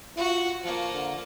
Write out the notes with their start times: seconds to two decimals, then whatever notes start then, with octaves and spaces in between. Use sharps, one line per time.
0.17 F4 F#4 C#6
0.63 F3 A#3 F4
0.93 D3